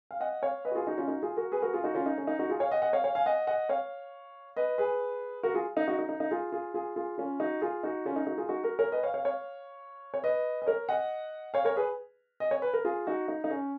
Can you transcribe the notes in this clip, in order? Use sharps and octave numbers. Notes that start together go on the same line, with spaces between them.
F5
D#5 F#5
C#5 F5
B4 D#5
F#4
F4 G#4
D#4 F#4
C#4 F4
D#4 F#4
F4 G#4
F#4 A#4
G#4 B4
F#4 A#4
F4 G#4
D#4 F#4
C#4 F4
D#4
C#4
D#4
D#4 F#4
F4 G#4
C#5 F5
D#5 F#5
D#5 F#5
C#5 F5
C#5 F5
F5 G#5
D#5 F#5
D#5 F#5
C#5 F5
B4 D#5
G#4 B4
F#4 A#4
F4 G#4
D#4
D#4 F#4
D#4
D#4
D#4
F4 G#4
F4 G#4
F4 G#4
F4 G#4
C#4 F4
D#4 F#4
F4 G#4
D#4 F#4
C#4 F4
D#4
D#4 F#4
F4 G#4
D#4 F#4
F#4 A#4
A#4 C#5
B4 D#5
C#5 F5
C#5 F5
C#5 F5
C#5
B4 D#5
D#5
A#4 C#5
D#5 F#5
C#5 F5
A#4 C#5
G#4 B4
D#5
C#5
B4
A#4
F4 G#4
D#4 F#4
D#4
D#4
C#4